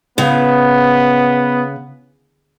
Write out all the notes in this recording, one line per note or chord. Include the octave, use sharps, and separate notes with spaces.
C#3 B3